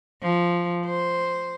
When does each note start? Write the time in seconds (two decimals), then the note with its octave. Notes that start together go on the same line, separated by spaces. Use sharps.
0.23 F3
0.86 C5